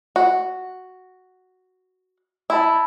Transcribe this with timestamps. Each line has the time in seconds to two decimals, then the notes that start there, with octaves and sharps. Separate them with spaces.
0.16 F#4
2.50 E4 A5 B5 E6